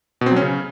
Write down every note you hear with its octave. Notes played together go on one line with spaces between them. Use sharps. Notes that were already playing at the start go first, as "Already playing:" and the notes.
B2
C4
F#3
C#4
C#3